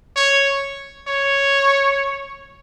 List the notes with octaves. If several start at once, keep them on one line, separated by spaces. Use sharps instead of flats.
C#5
C#5